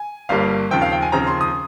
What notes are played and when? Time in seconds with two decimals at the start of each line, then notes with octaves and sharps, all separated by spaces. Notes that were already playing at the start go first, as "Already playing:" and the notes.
Already playing: G#5
0.29 G1 G2 G3 A#3 F5
0.71 D#2 C#3 F3 C4 G5
0.82 F5
0.92 G5
1.02 G#5
1.12 D#2 C#3 F3 C4 A#5
1.27 C6
1.41 D#6